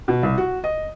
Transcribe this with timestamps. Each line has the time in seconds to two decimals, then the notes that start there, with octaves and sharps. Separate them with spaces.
0.08 B2
0.23 C2
0.38 F#4
0.64 D#5